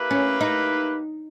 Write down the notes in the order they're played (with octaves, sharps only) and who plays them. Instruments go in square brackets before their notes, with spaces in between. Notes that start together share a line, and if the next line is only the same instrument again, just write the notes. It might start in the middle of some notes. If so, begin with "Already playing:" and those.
Already playing: [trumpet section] A#3 E4 G4 B4
[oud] C#4
D#4